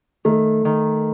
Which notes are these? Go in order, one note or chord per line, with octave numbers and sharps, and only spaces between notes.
D#3 A3
D#3